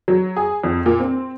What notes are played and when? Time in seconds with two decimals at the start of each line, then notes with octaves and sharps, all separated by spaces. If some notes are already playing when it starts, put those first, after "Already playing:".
0.08 F#3
0.36 G#4
0.64 F2
0.86 A#2
1.00 C4